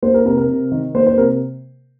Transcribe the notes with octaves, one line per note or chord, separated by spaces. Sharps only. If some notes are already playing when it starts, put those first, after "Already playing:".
A#3 C5
A#4
C3 A#4
A#4
C3
D#3
A#3 C5
C5
C3 A#4